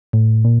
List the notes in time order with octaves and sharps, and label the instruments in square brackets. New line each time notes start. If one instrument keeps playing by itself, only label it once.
[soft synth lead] A2
A#2